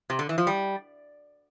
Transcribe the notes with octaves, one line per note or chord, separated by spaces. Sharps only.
C3
D3
E3
F3
G3